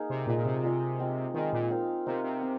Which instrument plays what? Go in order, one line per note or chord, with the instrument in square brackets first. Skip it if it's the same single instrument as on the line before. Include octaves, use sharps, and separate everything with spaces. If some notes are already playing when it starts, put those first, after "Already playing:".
Already playing: [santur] A#3 D#4 G#4 F5
[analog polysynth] C3
[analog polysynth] A#2 [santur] G#3 F4 G#4 D#5
[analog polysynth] A#2
C3
[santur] G#3 F4 G#4 D#5
G#3 C4 F4
[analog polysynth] D#3 [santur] G#3 C4 F4
[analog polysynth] A#2
[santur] C4 D#4 A#4 F5
[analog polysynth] C3 [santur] C4 D#4 A#4 F5
[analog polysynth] C3
[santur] C4